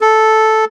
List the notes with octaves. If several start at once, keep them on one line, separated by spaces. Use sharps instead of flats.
A4